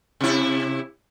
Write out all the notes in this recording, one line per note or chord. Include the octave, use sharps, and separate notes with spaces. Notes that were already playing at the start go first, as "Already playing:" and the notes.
C3 E4